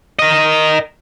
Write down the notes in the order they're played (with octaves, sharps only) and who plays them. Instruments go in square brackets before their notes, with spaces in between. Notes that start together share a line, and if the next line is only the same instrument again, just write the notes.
[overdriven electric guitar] A#4 D#5